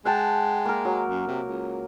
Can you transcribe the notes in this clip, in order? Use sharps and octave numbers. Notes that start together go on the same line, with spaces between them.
G#3 F#5 G5 A5
A#3 A#4
F#3
F#2
C3
C#2